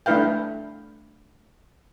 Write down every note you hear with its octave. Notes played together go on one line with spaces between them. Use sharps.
A3 D4 E4 B4 F5 G5